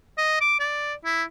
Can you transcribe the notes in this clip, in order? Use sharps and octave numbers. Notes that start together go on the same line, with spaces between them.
D#5
D6
D5
E4